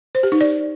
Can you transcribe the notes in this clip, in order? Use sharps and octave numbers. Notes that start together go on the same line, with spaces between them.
C5
G4
D#4
D5